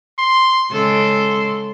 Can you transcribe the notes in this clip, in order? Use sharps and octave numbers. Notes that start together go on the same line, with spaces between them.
C6
C#3 G#3 A4 C6